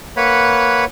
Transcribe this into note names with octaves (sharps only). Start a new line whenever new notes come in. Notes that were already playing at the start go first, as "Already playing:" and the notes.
A#3 B4 C#5 F#5 B5